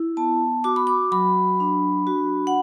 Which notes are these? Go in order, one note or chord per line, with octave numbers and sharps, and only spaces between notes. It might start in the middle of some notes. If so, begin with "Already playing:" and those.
Already playing: E4
B3 A5
F#4 D6
B5
D6
F#3 B5
D4
F#4
F#5